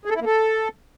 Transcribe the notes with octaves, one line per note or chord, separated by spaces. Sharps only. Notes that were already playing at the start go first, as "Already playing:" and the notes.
G#4
A4
E4
A#3
A4